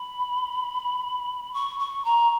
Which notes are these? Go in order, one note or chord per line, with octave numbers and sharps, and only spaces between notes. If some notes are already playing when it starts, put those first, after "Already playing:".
Already playing: B5
C#6
C#6
A#5